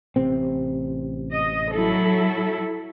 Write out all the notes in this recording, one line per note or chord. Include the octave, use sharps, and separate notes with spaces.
A1 C3 C4
D#5
F#3 E4 A4